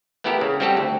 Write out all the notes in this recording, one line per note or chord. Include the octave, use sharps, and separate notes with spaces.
A3 B3 E4 G4 A4 A#4
C#3
G3 C4 F#4 G4 A4
D2